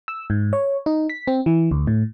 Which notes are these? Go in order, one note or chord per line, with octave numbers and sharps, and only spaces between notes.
E6
G#2
C#5
D#4
B6
C4
E3
D2
A2